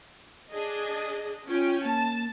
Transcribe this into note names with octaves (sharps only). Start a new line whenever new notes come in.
D4 G#4 D#5
C#4 F4 G5
A#3 A5